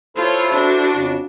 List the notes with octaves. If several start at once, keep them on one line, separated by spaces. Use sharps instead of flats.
E4 F4 A4 C5 C#5
D4 F#4
F2 C#3